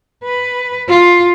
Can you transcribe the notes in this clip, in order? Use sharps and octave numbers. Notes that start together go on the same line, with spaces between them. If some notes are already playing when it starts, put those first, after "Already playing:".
B4
F4